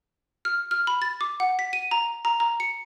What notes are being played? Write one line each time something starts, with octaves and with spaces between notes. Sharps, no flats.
F6
F6
B5
A6
D6
F#5
B6
D#7
A#5
A#5
A#5
C#7